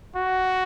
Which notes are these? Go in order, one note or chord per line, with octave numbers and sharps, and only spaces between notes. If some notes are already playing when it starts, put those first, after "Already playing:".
F#4